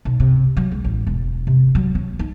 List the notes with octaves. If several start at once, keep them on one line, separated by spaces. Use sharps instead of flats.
B1
C3
F#3
C#2
A1
E1
C3
F#3
C#4
D#4